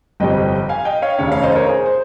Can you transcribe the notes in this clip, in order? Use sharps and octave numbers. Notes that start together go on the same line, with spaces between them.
G1 F2 C3 G3 C4 D#5 G5
F5 G#5
D#5 G5
C#5 F5
F1 D#2 C#3 C#5 F5
C#5 F5
C5 D#5
A#4 C#5
G#4 C5
C5